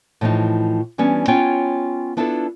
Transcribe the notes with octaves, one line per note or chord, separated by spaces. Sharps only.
A2 E3 F3 D#4
E3 G3 B3 C#4 D4
B3 C#4 F4 C#5 F#5 G5
B3 D4 E4 F4 A4 B4